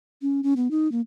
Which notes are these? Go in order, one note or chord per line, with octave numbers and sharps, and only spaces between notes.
C#4
C#4
B3
D#4
A#3